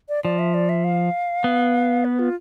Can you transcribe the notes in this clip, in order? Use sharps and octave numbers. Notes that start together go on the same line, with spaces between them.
D5
F3 D5
E5
D5
E5
F5
B3
B4
F4